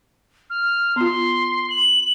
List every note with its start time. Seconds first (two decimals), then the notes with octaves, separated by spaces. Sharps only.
0.50 F6
0.96 B3 F4 C6
1.70 F#7